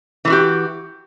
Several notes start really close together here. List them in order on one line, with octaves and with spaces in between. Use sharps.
E3 A3 F#4 G4